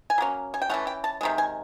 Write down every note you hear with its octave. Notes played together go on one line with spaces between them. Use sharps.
G#5
F#3 A#3 C#4
G#5
G5
E3 A3 C#4 F#5
G5
A5
C3 D#3 G#3
G#5